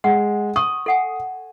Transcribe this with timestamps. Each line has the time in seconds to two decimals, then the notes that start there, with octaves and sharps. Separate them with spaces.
0.04 G#3 F#5
0.56 C#6 D#6
0.86 A4 F#5 G#5